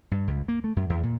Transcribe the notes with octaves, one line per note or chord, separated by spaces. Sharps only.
G2
C#2
A#3
A3
F#2
E2
A#2